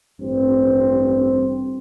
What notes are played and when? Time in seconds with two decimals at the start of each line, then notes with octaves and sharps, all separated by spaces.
0.21 A1 G2 C4